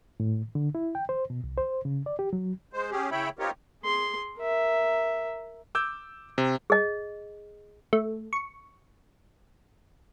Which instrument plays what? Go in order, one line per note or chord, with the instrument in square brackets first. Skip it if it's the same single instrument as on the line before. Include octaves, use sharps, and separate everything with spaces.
[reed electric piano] A2
D3
E4
G5
C5
B2
C2
C5
C#3
D5
G4
F#3
[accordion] G#3 C5
C#4 G4 G#4
C#3 E4 C#5 E5 G5 B5
C4 D#4 F4 G4 A#4 C#5
[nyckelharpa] G#4 C6
A#4 E5
[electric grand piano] D6 E6 G6
C3
[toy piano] G#4 D#5
[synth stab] A3
C#6